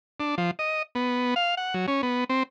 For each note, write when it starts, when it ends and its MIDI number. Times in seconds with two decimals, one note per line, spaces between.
0.20 0.35 62
0.38 0.51 53
0.59 0.82 75
0.95 1.34 59
1.36 1.55 77
1.57 1.74 78
1.74 1.86 54
1.88 2.02 61
2.03 2.24 59
2.29 2.43 60